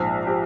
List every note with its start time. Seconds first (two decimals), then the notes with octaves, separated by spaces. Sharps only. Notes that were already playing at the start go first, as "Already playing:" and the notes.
Already playing: A#1 G#2 F3
0.27 F3 G4